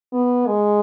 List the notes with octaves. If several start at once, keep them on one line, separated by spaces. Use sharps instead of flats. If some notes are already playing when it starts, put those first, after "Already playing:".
B3
G#3